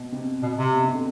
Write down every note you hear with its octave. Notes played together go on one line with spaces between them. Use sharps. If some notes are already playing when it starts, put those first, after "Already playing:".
Already playing: B2
C3
B2
C3
B2
C3
D3